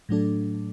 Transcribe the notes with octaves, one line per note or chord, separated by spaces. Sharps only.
A2 F#3 A3 D4 A4